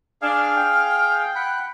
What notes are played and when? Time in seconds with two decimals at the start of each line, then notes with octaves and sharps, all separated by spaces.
0.22 D4 G#4 F5 F6
0.56 G5
1.36 F#5 B5